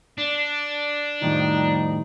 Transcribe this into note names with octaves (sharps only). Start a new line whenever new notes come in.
D4
F2 A2 D#3 F3 G3 D#4